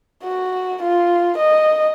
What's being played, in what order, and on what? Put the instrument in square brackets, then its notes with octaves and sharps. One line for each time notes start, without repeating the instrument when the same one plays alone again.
[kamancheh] F#4
F4
D#5